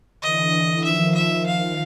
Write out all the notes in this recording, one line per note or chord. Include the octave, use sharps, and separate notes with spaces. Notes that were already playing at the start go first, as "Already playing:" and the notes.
D3 E3 D#5
D#3 F3 E5
E5
F5